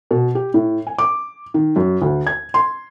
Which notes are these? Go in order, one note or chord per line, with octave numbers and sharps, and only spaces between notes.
B2
G4
A2
G#5
D6
D#3
F#2
D2
G#6
C6